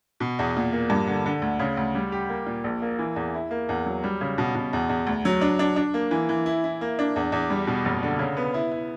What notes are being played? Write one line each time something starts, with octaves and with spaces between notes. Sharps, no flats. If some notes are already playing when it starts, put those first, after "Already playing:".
B2
E2
A#2
A#3
G2
D3
D3
D2
C#3
D2
G3
G4
A#3
A#2
A#1
A#3
E3
E2
E4
A#3
E2
F#3
G3
C#3
B2
B2
E2
E2
D2
F#3
D4
D4
D4
A#3
E3
E3
E4
E4
A#3
D4
E2
E2
G3
B2
F#1
D3
C#3
B3
E4
E4